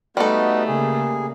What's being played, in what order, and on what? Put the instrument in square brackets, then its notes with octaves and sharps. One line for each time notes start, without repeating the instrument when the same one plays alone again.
[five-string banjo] G3 A4 [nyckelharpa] A3 [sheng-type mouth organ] B3 D#4 F#4
[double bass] C#3 A#3 [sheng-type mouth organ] G#4